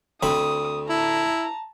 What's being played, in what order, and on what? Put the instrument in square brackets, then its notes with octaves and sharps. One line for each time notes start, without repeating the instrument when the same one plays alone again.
[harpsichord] D2 C4 B5 [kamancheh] D#6
[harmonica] E4 [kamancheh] A5 A#5